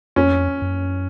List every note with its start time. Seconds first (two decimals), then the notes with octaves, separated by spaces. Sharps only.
0.16 F2 C#4
0.62 F#2